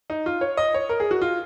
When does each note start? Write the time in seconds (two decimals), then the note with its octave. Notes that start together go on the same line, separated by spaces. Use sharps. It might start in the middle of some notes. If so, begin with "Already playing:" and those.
0.10 D#4
0.26 F4
0.41 C#5
0.57 D#5
0.74 C#5
0.89 A#4
1.00 G#4
1.11 F#4
1.22 F4